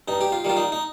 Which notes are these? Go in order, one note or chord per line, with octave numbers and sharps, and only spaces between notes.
G2 D#4
G4
F4
D#3 G3 F4
D#4
D#4